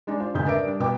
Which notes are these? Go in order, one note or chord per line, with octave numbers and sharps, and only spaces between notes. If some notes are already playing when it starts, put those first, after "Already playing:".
G#3 D4 D#4
D4 F4 C5
F1 D2 G#2 C#3 D#6 G6
D4 A#4 B4 D5 E5 D7
G3 D4
C2 B2 B3 G5 D6